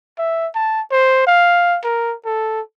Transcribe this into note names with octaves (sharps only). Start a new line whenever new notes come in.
E5
A5
C5
F5
A#4
A4